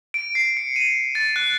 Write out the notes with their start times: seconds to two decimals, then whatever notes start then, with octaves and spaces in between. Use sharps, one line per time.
0.14 D7
0.35 C7
0.57 C#7
0.76 D#7
1.15 A6
1.36 F#6